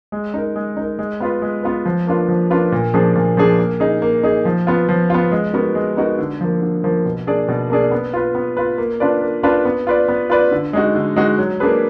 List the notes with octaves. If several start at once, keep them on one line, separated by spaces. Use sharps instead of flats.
G#3
D#4 A#4
G#3
D#4 A#4
G#3
B3 F4 B4
G#3
B3 F4 B4
F3
A#3 D4 F4 B4
F3
A#3 D4 F4 B4
A#2
F3 A#3 D4 G#4
A#2
F3 A#3 D4 G#4
A#3
D#4 G#4
A#3
D#4 G#4
F3
B3 F4
F3
B3 F4
G#3
B3 D#4 F#4 A#4
G#3
B3 D#4 F#4 A#4
D3
F3 A#3
D3
F3 A#3
B2
A#3 D4 G#4 D5
B2
A#3 D4 G#4 D5
B3
F4 B4
B3
F4 B4
A#3
D4 F4 B4 D5
A#3
D4 F4 B4 D5
B3
F4 B4 D5
B3
F4 B4 D5
D3
G#3 D#4 F#4
D3
G#3 D#4 F#4
F#3
A#3 D4 G#4 B4